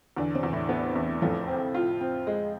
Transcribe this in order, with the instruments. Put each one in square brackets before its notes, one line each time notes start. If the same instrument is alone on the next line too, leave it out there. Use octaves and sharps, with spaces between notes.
[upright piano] E2 [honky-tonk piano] D3 D4
[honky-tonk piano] C3 C4
[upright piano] E2
[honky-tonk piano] A2 A3
[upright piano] B3
E2
[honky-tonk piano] F2 F3 [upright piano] A2
[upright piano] C4
F4
C4
G#3